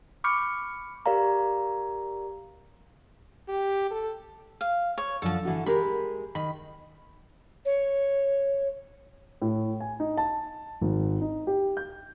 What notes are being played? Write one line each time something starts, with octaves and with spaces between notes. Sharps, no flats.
B5 C#6 D6 F6 G6 C#7
G4 A#4 D5 F5 A#5
G4
A4
F5
C#5
F#2 D3 F3 A4 A5
D3 E3 F#4
G#3 G4 A#4 B5
D#3 B5
C#5
A2
G#5
D#4
A5
G#1
D#4
G4
G6